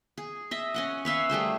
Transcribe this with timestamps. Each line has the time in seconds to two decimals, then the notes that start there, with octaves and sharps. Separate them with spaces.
0.18 G#4
0.51 D#5 E5
0.74 C#4 D#5 F#5
1.05 B4 C#5 E5 F5
1.30 G3 A3 G#4 C5